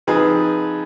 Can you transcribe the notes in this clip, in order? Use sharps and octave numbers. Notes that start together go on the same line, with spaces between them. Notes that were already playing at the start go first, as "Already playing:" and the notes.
F3 C4 D#4 G#4 B4